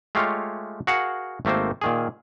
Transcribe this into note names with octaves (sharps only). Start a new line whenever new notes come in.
G#3 A3 F4 G4 C#5 F5
F#4 G#4 A#4 F5 F#5
G#1 A3 A#3 C4 C5
A#2 D#3 G#4